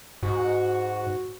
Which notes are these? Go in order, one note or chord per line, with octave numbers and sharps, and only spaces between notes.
G#2 F#4